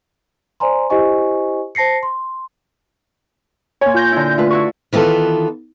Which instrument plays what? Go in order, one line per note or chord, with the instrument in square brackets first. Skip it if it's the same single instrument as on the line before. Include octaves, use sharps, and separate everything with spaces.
[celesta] C5 D5 G#5 A#5 C6
E4 G4 C5 D#5 G#5 C#6
C5 A5 A#6 C7 C#7
C6
[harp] A#2 G#5 [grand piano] C#5
[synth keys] F4 G6 A#6
[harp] D3 E4
[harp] A3 B4 [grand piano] F4
[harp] E4 F#4 B4 [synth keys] C#6
[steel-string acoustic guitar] D#3 E3 B3 F4 A4